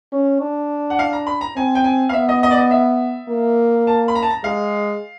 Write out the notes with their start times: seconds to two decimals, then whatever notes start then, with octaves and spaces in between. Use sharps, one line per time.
0.12 C#4
0.41 D4
0.90 F#5
0.99 F5
1.13 A#5
1.27 B5
1.41 A#5
1.56 C4 G#5
1.75 G5
1.84 G#5
2.09 F5
2.13 B3 E5
2.29 D#5
2.43 D#5
2.51 D5
2.57 D#5
2.71 E5
3.29 A#3
3.87 A5
4.08 B5
4.15 A#5
4.22 A5
4.30 A#5
4.44 G#3 F5